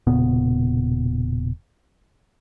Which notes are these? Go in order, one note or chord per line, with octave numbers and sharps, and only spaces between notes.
E1 A#2 C#3 B3